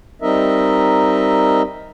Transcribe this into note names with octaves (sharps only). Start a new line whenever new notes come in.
G3 C4 D#4 A#4 D#5 E5